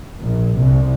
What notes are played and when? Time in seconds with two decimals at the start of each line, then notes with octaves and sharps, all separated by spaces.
0.19 A#1
0.58 C2